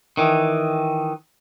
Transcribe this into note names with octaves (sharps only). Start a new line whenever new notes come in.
D#3 E3